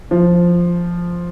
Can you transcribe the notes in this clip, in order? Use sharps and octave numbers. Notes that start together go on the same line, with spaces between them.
F3